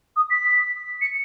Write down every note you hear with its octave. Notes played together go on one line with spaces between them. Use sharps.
D#6
B6
C#7